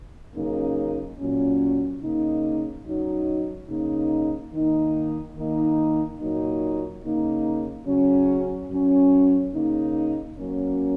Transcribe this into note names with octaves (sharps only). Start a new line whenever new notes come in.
F#2 C#3 A#3 D#4
A#2 F#3 C#4
C#3 A#3 D#4
F#2 F#3 D#4
C#3 A#3 D#4
D#3 A#3 D#4
D#3 A#3 D#4
A#2 F#3 A#3 D#4
C#3 A#3 D#4
C#3 F#3 C#4
F#2 F#3 C#4
C#3 A#3 D#4
F#2 F#3 A#3 C#4